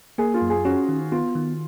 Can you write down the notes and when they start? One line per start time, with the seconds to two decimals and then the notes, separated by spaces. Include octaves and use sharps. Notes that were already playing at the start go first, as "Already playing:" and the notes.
0.18 A#3 G#4
0.34 F4
0.42 F#2
0.50 G#4
0.65 C#4 F#4
0.89 D#3
1.12 B3 F4
1.35 D#3